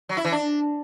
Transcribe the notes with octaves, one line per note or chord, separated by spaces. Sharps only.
F#3
E4
E3
D4